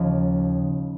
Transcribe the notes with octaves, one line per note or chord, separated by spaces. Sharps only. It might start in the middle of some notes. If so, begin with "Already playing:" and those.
Already playing: D#2 C#3 F3